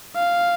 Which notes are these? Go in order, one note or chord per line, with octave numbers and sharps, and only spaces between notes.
F5